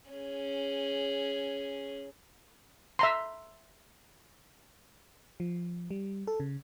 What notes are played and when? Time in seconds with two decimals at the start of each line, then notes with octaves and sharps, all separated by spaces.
0.11 C#4 G#4
2.99 E5 A#5 C6
5.40 F3
5.91 G3
6.27 A4
6.40 C#3